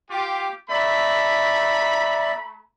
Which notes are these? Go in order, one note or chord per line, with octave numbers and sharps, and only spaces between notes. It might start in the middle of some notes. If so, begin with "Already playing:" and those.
F4 G4 D6
A3 D5 E5 A#5 B5